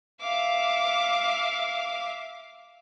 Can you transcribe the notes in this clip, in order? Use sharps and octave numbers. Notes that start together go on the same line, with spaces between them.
E5 F5 D6